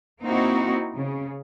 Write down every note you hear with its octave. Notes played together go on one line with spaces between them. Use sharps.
A#3 C4 D#4 E4 F#4
C#3